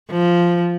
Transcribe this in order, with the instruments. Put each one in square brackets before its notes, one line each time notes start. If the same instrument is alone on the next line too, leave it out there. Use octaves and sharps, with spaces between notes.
[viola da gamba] F3